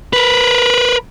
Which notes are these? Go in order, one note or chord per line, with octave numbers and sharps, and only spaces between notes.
A#4 B4